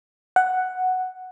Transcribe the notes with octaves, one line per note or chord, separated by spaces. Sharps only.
F#5